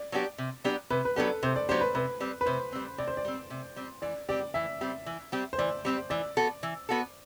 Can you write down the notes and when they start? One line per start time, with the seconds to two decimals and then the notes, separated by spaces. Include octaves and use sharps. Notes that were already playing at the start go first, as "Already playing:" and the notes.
Already playing: D5
0.12 F#3 B3 D4 G4
0.38 C3
0.64 F#3 B3 D4 G4
0.90 C3 B4
1.05 B4
1.16 F#3 B3 D4 G4 A4
1.43 C3 C5
1.56 D5
1.69 F#3 B3 D4 G4 C5
1.81 B4
1.95 C3 B4
2.20 G3 C4
2.41 B4
2.46 C3 C5
2.72 G3 C4
2.98 C3 D5
3.08 C5
3.17 D5
3.25 G3 C4
3.50 C3
3.76 G3 C4
4.02 E3 D5
4.29 G3 C4 G4 D5
4.54 E3 E5
4.81 G3 C4 G4
5.06 E3
5.32 G3 C4 G4
5.53 C5
5.58 E3 D5
5.85 G3 C4 G4
6.10 E3 D5
6.37 B3 F#4 A4
6.63 E3
6.89 B3 F#4 A4